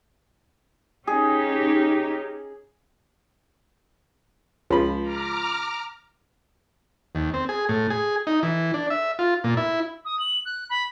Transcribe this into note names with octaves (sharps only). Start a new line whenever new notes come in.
C#4 D#4 G4 G#4
C#2 F3 B5
A#5 D6 F6
D#2
C4
G#4
A2
G#4
D#4
E3
D4
E5
F4
A#2
E4
D#6
F#7
F#6
B5